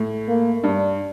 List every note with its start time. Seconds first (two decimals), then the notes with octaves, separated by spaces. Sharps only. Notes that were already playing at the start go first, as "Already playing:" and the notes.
Already playing: A2
0.28 A#3
0.63 G2 D4